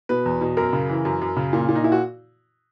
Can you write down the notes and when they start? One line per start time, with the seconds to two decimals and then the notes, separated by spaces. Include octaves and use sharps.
0.09 B2 B4
0.26 E2
0.41 B2
0.57 F#2 A#4
0.73 C#3
0.90 E3
1.05 F#2
1.21 F#2
1.37 C#3
1.53 A#2
1.68 A#2
1.75 D#4
1.84 A#2 E4
1.92 F#4